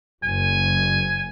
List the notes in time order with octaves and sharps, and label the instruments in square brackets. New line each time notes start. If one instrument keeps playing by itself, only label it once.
[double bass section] F#1 [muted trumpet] G#5